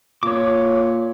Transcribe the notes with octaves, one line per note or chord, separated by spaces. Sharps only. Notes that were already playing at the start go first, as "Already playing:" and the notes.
A#2 C#5 D6